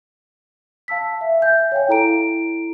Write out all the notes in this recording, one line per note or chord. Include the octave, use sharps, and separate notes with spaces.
F5 A5 E6 B6
E5
E5 G#5 G6
C#5 F5 G5 G#5
E4 A4 A#5 D7